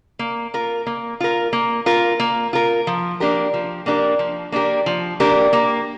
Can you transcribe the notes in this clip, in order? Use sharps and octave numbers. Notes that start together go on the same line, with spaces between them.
A#3
F4 A#4
A#3
F4 A#4
A#3
F4 A#4
A#3
F4 A#4
F3
A#3 D4 G4 A#4
F3
A#3 D4 G4 A#4
F3
A#3 D4 G4 A#4
F3
A#3 D4 G4 A#4
A#3